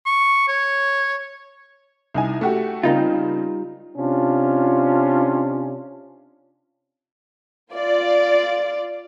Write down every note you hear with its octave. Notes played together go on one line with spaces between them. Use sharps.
C#6
C#5
C2 D#4 G#5
A3 F#4 G4
C#3 G3 A#3 C4 D#4 F4
C3 C#4 D4 F4
F4 D5